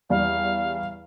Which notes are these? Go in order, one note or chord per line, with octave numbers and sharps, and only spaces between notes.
E2 G3 F5